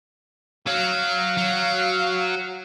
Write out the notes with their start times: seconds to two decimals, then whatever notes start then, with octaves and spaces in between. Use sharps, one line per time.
0.67 F#3 F5
1.37 F#3